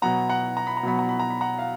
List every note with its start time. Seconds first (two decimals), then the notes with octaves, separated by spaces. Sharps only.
0.02 B2 F#3 B3 F#5 A#5
0.29 F#5 A#5
0.57 A#5
0.67 B5
0.77 A#5
0.83 B2 F#3 B3 B5
0.99 A#5
1.09 B5
1.19 A#5
1.30 B5
1.41 F#5 A#5
1.59 F5